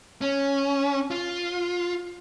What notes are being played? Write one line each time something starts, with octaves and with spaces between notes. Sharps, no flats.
C#4
F4